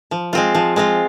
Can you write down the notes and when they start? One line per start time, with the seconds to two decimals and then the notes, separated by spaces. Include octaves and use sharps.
0.11 F3
0.33 G#3 C4 F4
0.55 F3
0.76 G#3 C4 F4